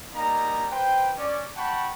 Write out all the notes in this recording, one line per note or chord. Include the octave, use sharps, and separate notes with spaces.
G3 A#3 D#4 A#5
B4 C5 G5
C#4 D5
F#5 G5 A5 B5 C#6